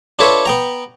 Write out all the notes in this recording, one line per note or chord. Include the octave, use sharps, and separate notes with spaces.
D4 F4 A4 B4 C#5 E5
B3 G5 A#5